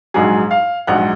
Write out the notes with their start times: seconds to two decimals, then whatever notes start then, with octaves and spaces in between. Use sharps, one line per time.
0.14 A#1 G#2 F#3 G#4
0.51 F5
0.87 A#1 G#2 F#3 F#5